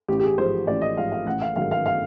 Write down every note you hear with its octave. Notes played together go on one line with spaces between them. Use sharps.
A1 G4
G4
G#4
G#2 F3 C5
A1 D5
D#5
G#2 F3 F5
F5
A1 F#5
F5
G#2 D#3 F#3 F5
F5
F5